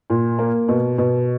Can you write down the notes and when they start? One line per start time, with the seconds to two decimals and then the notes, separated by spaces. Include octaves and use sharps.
0.10 A#2
0.39 A#3
0.68 B2
0.98 B2